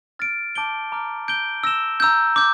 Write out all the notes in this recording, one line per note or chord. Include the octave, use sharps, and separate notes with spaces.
F6 A6 D7
A5 D6 G6 D7 G7
A#5 D6 F6
G6 D7 G7
E6 A#6 E7 G7
A#5 E6 G6
D6 G6